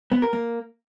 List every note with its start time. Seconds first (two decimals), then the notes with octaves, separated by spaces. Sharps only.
0.12 B3
0.22 A#4
0.33 A#3